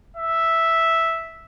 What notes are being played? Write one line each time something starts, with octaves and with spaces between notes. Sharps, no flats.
E5